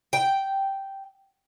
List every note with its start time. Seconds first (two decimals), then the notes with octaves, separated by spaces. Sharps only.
0.13 G5